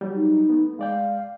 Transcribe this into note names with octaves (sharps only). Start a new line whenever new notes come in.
F#3 G3
D#4
A3 B3
G#3 D5 F5 G5